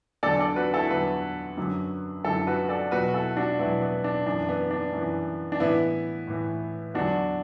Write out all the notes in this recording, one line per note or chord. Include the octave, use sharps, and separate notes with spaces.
E2 D3 F#3 A4 D5
A4 D5
F#4 B4
E4 A4
E2 D3 F#3 F#4 B4
F#2 D3 F#3
F#2 D3 F#3 E4 A4
F#4 B4
A4 D5
E2 B2 F#3 F#4 B4
E4 A4
D4 F#4
E2 B2 F#3 B3 E4
B3
D4
F#2 E3 D4
B3
D4
F#2 E3
D4
A2 E3 B3 E4
A2 E3
E2 D3 F#3 D4 F#4